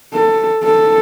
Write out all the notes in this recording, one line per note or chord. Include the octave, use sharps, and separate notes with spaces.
A4
A4